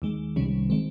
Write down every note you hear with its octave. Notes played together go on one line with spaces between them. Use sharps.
D#2 D#3 G#3
C2 C3 D#3 G3 C#4
D#3 G#3 C4